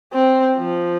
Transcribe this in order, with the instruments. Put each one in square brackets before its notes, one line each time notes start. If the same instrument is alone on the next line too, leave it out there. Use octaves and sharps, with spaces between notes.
[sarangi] C4
F3